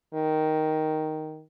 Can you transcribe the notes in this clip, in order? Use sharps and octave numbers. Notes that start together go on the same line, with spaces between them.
D#3